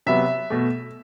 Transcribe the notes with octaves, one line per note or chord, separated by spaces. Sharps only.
C3 F#3 B3 E5
B2 A3